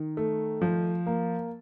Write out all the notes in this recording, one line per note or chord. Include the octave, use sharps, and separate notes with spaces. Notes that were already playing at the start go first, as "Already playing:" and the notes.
Already playing: D#3
A3
F3
A#3